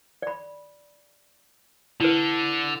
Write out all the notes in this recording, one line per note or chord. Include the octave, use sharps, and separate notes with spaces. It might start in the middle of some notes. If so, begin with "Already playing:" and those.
D5 B5
D3 E4 B4